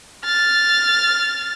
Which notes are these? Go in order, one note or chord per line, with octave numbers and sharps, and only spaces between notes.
F6 A6